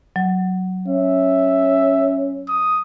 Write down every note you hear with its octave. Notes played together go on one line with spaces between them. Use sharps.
F#3
C#4 E5
D#6